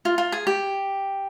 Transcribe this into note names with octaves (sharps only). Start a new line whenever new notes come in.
F4
F4
G#4
G4